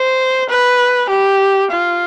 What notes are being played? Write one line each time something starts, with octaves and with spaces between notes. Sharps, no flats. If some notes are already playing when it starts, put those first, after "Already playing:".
Already playing: C5
B4
G4
F4